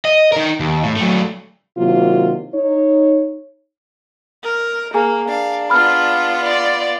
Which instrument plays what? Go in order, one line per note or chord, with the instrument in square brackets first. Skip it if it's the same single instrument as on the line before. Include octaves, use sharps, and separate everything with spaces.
[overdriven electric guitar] D#5
D#4 A#4
D#2
A2
F#3 A3
[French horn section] C3 D#3 F#3 A#3 E4 F4
D#4 C#5
[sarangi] A#4
[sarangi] A#3 [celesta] G#4 G#5 A#5
[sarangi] D4 [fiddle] F5
[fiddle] B3 F4 [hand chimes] B5 F6
[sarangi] D5